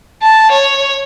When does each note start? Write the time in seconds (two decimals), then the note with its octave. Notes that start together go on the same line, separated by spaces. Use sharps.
0.22 A5
0.52 C#5